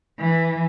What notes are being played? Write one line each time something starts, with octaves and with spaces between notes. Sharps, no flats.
E3